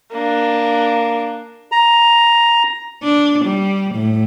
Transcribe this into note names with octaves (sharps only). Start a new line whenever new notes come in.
A#3 D4
A#5
D4
G3
A2